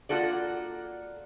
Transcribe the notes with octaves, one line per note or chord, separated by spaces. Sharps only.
A#3 F4 F#4 A4 D5